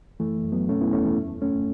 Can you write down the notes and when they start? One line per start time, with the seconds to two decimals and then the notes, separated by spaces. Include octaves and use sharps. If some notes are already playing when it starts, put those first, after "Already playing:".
0.20 F#2 E3 A3
0.45 F#2
0.52 F#3 B3
0.69 B2 A3 C#4
0.81 B3 E4
0.93 E2 A3 C#4
1.05 E3 A3
1.17 F#2
1.41 F#2 A3 C#4